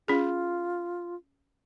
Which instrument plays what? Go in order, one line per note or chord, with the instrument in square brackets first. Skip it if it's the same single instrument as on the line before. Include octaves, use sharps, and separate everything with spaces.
[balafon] C#4 G#4 [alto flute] F4